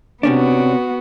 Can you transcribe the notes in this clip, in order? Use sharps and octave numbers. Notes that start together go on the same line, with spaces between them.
C3 B3 C#4 D4 F#4